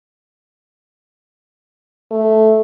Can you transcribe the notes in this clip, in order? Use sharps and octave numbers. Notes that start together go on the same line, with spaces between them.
A3